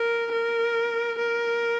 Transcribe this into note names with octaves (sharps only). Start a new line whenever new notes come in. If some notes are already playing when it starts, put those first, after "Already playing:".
Already playing: A#4
A#4
A#4